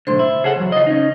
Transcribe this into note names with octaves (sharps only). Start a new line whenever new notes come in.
B1 A2 D3 C5 C6
E4
C#3 G#4 A4 F#5
E2 F#3
F4 D#5
C#4 D#4